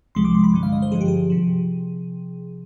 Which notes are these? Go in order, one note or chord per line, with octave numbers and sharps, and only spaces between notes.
C2 C3 F3 G#3 C6
D6
C6
B5
G2 D3 G#3
F5
D#5
C5
G2 D3 F3 G#4
G4
G#4
C3 F3